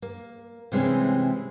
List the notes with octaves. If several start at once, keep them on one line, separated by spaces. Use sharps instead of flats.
A#3
C3 E3 G3 G#3 C4 C#4